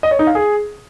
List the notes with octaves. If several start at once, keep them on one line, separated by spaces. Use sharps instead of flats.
D#5
C#5
D#4
F5
G#4